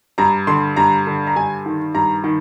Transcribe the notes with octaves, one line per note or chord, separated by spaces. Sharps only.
G2 A#5
D3 C6
G2 A#5
D3
A#5
G2 G#5
D#3
G2 A#5
D#3